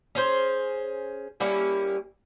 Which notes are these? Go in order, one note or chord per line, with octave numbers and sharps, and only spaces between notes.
C#4 G#4 C5
G3 A#3 C#4 E4